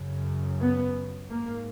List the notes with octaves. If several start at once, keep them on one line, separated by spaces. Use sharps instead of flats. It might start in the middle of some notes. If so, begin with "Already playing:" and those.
Already playing: F#2 C#3
B3
G#2 A#3